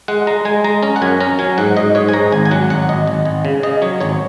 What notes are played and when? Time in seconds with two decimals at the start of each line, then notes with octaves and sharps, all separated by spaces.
0.08 G#3 F#5
0.27 G#3 A#5
0.45 G#3 G#5
0.64 G#3 A#5
0.83 C#4 A#5
0.96 F#5
1.02 F#2 G#5
1.21 C#4 A#5
1.39 F#3 G#5
1.58 G#2 F#5
1.77 G#2 D#5
1.95 G#2 C#5
2.09 G#5
2.13 G#2 A#5
2.32 G#1 G#5
2.45 G#5
2.51 F#3 F#5
2.70 G#1 F#5
2.89 G#1 D#5
3.07 G#1
3.25 G#1
3.45 C#3
3.63 C#3 D#5
3.82 F#3 C#5
4.00 G#1 C#5